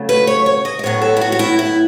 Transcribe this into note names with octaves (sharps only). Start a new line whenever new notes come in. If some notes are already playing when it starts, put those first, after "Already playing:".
Already playing: C#3 F#3 A3
B4
C#5
C#5
D#5
D#5
A2 F#3 B3 C#5
A4
E4
F#4
F#4
E4
E4